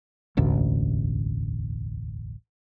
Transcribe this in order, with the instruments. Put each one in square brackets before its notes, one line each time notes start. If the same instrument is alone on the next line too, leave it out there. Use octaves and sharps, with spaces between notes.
[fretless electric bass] E1 A1 D2